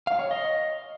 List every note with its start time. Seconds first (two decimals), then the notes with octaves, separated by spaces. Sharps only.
0.07 F5
0.19 C#5
0.31 D#5